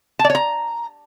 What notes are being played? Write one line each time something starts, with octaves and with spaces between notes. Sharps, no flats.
A5
D5
C#5
A#5